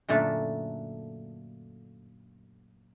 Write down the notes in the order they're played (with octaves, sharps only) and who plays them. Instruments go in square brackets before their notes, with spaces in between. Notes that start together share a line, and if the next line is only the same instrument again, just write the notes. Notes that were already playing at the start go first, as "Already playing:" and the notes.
[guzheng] F#2 A#2 D3 A3